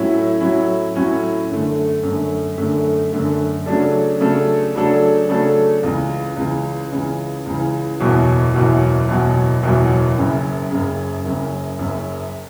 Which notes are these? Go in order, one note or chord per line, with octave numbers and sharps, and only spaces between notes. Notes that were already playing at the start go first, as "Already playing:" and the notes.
Already playing: A2 F#3 C#4 E4
A2 F#3 C#4 E4
A2 F#3 C#4 E4
F#2 D3 A3
F#2 D3 A3
F#2 D3 A3
F#2 D3 A3
C#3 F#3 A3 D4 A4
C#3 F#3 A3 D4 A4
C#3 F#3 A3 D4 A4
C#3 F#3 A3 D4 A4
C#2 C#3 E3
C#2 C#3 E3
C#2 C#3 E3
C#2 C#3 E3
F#1 E2 B2 F#3
F#1 E2 B2 F#3
F#1 E2 B2 F#3
F#1 E2 B2 F#3
F#1 F#2 C#3
F#1 F#2 C#3
F#1 F#2 C#3
F#1 F#2 C#3